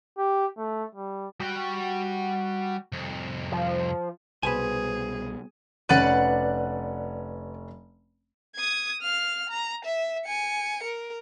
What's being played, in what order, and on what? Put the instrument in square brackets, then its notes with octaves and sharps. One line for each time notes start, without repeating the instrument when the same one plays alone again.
[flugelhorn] G4
A3
G3
[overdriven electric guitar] G3 G5 [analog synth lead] F#4
[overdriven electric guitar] C2 F2
[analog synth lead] F3
[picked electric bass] C2 B2 [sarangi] G#4 [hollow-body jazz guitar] B4 C5 G#5
[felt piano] F1 C#4 [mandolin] B4 D5 F#5
[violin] D#6 G#6
F5 F6
A#5
E5
G#5 C#7
A#4